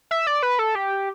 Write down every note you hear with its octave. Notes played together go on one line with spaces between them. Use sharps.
E5
D5
B4
A4
G4